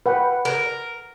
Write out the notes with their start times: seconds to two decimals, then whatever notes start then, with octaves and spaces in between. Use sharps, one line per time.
0.06 B4 F#5 G5
0.45 A#4